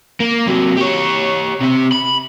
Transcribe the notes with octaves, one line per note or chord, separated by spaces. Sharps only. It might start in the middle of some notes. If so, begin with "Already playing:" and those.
A#3
C3 F#3
G4 C#5
C3 C4
B5